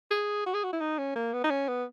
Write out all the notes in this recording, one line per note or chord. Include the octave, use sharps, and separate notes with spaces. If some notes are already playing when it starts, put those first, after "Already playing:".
G#4
F#4
G#4
F#4
E4
D#4
C#4
A#3
B3
D#4
C#4
B3